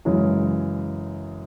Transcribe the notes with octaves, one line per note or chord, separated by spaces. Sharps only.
F#2 C#3 E3 G#3